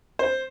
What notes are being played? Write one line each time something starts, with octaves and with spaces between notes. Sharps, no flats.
C5